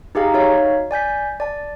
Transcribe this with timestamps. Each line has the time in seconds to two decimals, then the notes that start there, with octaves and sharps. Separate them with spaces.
0.15 D#4 G4 G#4 F5 A#5
0.34 D#4 F#4 C#5 E5 F5
0.91 D5 G#5 G6 B6
1.40 D5 A5